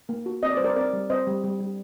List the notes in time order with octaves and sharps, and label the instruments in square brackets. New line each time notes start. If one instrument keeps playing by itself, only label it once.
[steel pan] A#3
F#4
C4 D#5
D5
G3 C5
A#4 D5
C4 A#4 D5
G3
C4 C5 D#5
G3
G3
G3